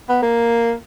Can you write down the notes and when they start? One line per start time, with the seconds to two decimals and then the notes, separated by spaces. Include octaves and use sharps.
0.09 B3
0.23 A#3